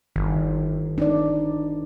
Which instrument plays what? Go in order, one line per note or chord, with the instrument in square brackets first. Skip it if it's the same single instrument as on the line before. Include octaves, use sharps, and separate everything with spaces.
[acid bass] G1 [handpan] D#3
[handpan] D4 D#4 D5